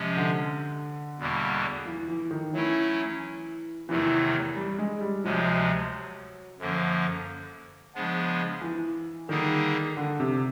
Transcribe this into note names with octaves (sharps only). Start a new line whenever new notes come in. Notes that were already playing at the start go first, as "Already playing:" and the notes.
Already playing: C3 F3 G#3 C#4
D3
E2 B2 G3 A#3
E3
E3
D#3
E3 F#3 A3 C#4 E4
E2 C3 D#3 E3 F#3 A3
G3
G#3
G3
D2 C3 F3 F#3 G#3
F#2 D3 F3 A#3
C#3 F3 G#3 B3 D4
E3
D3 D#3 G3 A#3 D#4 G#4
D3
C3